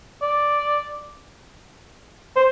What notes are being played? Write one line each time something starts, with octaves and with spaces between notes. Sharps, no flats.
D5
C5